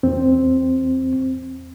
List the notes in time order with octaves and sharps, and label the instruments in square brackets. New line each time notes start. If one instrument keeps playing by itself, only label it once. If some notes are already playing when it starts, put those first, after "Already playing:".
[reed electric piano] E2 C4